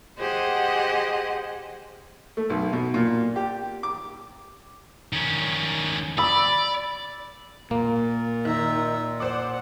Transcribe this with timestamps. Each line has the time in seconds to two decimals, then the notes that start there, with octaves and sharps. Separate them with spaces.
0.17 G4 G#4 C5 D#5 F#5
2.37 A3
2.50 B1
2.73 B2
2.94 A#2
3.36 G4
3.83 D6
5.13 D#3 C#4
6.18 D5 B5 E6
7.71 A#2 A#3
8.45 D#3 D#4 E5 A#5
9.20 C5 D5 F#5 D6